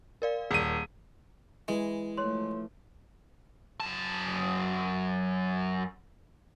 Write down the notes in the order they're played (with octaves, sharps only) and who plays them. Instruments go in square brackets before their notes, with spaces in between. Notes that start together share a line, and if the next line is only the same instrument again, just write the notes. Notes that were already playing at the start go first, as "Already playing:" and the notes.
[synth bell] A#4 D5 F5
[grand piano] D#1 D#7 [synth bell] G#4
[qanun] E3 [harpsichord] G#3
[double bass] F3 A3 [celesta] C#5 C6
[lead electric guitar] F#2 A5